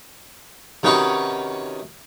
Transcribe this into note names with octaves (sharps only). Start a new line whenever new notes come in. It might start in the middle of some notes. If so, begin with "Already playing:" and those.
C3 D#3 C#4 D#4 F#4 B4